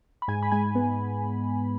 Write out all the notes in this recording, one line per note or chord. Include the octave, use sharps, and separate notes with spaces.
B5
G#2 G#5
B5
G#3 G#5
B3